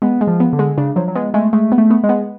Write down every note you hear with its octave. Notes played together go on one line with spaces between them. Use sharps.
G#3 B3
G#3
F3
B3
D3
G#3
C#3 D4
F3 F#3
F#3
G#3 B3
G#3 A3
G#3 A3
B3
A3
B3
G#3
B3